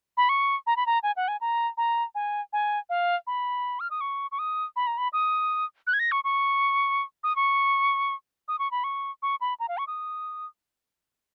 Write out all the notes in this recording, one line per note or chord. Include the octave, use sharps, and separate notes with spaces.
B5
C#6
A#5
B5
A#5
G#5
F#5
G#5
A#5
A#5
G#5
G#5
F5
B5
F6
D#6
C#6
C#6
D#6
B5
A#5
B5
D#6
F#6
G#6
A#6
C#6
C#6
D#6
C#6
D#6
C#6
B5
C#6
C#6
B5
A#5
F5
C#6
D#6